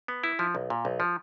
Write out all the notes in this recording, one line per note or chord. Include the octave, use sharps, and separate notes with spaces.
B3
E4
F3
B1
A#2
B1
F3